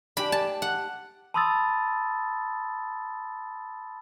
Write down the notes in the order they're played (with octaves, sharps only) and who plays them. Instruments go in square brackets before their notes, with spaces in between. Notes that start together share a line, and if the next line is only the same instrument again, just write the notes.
[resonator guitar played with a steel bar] D4 G4 [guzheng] B5
[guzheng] A5
F#5
[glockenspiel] A5 B5 C6 D#6 E6 A6